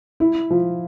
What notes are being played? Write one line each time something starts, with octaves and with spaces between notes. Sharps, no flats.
E4
F3